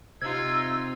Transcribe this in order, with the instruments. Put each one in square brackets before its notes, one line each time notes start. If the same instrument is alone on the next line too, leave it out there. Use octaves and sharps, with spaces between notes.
[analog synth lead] C3 [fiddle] D#4 F4 [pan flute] E6 [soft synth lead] G#6